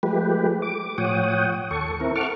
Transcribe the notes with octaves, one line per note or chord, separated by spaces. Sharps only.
F3 G#3 A3 G4 B4
D6
A2 F3 C#5 F#5 G5 D#6
D#2 A4 C#6
C4 E4 A#4
A4 F#5 C#6 D6 F6